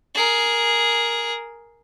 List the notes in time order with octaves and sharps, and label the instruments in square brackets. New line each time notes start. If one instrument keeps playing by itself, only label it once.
[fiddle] G#4 A#4